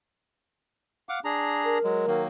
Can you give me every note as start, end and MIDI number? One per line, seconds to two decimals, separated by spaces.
1.09 1.19 77
1.09 1.19 78
1.09 1.19 86
1.25 1.78 62
1.25 1.78 68
1.25 1.78 82
1.65 2.22 70
1.84 2.06 54
1.84 2.06 56
2.07 2.28 51
2.07 2.28 54
2.07 2.28 58